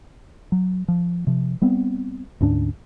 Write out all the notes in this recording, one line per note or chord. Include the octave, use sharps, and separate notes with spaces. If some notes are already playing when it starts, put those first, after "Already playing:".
F#3
F3
C3 F3
G3 B3 C4
D2 G#2 C#4 D4